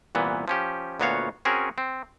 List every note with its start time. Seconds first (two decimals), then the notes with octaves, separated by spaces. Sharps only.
0.15 C2 A#2 E3 B3
0.48 F3 C#4 G4
1.00 D2 A#2 B3 F#4 C#5 F5
1.45 C4 C#4 F#4 G#4 A#4
1.78 C4